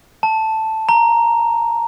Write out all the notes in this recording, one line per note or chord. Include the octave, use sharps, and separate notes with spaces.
A5
A#5